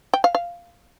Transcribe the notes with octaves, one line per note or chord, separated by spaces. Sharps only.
G5
F5
F5